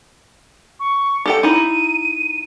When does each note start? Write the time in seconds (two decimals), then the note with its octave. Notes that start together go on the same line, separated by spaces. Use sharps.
0.80 C#6
1.26 G4 A4 G5 C#7
1.43 D#4 E4 D#7